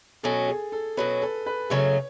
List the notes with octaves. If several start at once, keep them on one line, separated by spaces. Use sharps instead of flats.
B2 F#3 C#4 A4
G#4
A4
B2 F#3 C#4 B4
A4
B4
F#2 C#3 F#3 A3 C#4 C#5